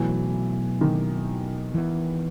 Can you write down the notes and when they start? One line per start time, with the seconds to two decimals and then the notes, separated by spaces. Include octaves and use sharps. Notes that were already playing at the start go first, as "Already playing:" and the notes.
Already playing: B2 E3 F#3 A3
0.81 D#3
1.74 E3 B3